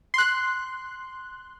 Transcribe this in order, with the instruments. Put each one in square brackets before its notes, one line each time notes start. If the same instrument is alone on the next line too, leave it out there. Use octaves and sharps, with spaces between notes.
[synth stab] C6 F#6